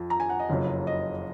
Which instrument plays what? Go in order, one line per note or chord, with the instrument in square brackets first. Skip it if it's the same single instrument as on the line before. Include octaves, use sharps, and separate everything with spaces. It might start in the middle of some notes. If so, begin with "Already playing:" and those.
Already playing: [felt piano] F2 F3
A#5
G#5
F#5
D#5
F#1 F2 C#3 F#3
D#5